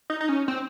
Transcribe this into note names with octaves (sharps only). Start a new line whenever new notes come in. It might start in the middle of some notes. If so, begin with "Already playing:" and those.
D#4
D#4
C#4
C4